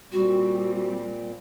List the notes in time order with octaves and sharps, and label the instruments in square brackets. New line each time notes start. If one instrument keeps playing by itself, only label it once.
[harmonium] A#2 [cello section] G3 C4 [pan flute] F#4